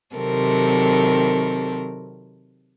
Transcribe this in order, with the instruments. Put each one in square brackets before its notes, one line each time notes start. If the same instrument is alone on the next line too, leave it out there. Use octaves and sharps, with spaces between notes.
[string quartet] C3 D#3 F#3 C4 A4 A#4